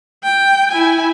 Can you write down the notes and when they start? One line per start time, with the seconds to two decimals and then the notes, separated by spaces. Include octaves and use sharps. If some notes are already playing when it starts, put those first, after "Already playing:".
0.24 G5
0.71 E4 G#5